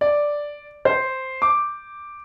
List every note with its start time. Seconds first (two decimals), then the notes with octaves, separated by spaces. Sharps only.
0.01 D5
0.85 C5
1.42 D6